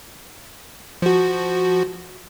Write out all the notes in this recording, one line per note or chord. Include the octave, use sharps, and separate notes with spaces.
F3 F#4